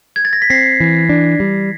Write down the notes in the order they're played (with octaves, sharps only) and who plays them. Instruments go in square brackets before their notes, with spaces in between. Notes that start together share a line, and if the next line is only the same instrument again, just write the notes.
[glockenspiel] G#6
A6
A#6
B6
[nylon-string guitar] C4 [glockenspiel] A#6 C7
[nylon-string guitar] E3
D4
G3